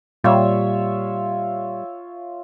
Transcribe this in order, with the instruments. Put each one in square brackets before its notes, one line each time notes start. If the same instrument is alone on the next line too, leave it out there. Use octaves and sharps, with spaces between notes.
[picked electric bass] A#2 [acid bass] G3 [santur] F4 C#5 E5